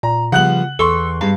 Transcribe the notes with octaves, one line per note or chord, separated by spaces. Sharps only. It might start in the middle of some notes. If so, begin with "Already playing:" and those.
A#2 A#5
C#3 F3 G3 B3 F#5 F#6 F#7
E2 A4 C6 C#6 G7
G2 G#3 F5